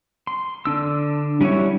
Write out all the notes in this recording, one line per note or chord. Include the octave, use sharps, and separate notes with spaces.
C6
D3 D4 E6
G3 C#4 E4 F#4 C#5